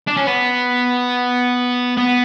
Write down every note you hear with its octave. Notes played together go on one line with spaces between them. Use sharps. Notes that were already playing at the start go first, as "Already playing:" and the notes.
D4
C#4
B3
B3